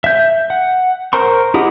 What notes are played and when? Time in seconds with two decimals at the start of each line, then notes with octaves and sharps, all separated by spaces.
0.04 E5 G6
0.50 F#5
1.13 A#4 C5 A#5 C6 C#6
1.54 E4 G4 G#4 D#5 F#5